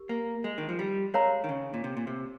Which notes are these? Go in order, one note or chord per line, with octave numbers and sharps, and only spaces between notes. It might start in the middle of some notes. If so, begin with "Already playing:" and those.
Already playing: G4 A#4
A#3
G#3
D#3
F3
G3
G#3 A#4 C#5 F5 A#5
D#3
C#3
A#2
C3
A#2
C3